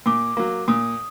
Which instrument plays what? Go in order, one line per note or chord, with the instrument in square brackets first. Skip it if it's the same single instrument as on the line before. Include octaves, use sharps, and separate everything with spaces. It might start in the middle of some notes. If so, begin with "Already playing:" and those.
[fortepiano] A#2 [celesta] D6
[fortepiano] F#3 A#3
[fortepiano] A#2 [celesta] D#6